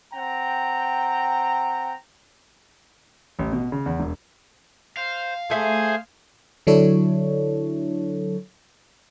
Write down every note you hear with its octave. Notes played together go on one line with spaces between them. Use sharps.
C4 F#5 G5 A#5
A1
B2
C#3
E2
E1
C5 F5
A3 G#4 C5 E5 G#5
D3 F#3 D4 E4 A4 C#5